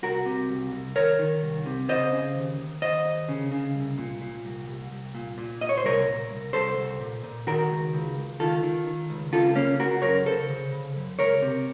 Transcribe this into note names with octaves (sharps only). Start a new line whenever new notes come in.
C2 F#4 A#4
C3
C2
C2
D#3 A#4 C#5
D#3
C2
C3
C#3 C5 D#5
C#3
D#2
D#2
D#2 C5 D#5
D#2
C#3
C#3
C2
A#2
A#2
C2
C2
C2
A#2
A#2
A#2 D#5
C#5
C5
C2 A#4 C#5
A#2
C2
C2 A4 C5
C2
A#2
A#2
D#3 F#4 A#4
C#2
C#2
C#2
D#3 F4 A4
D#3
D#3
C#2
C#3 F4 A4
C#3 A#3 C#4
C#3 F#4 A#4
F#2 A#4 C#5
C#3 A4 C5
C#3
C#3
F#2
C#2 A#4 C#5
C3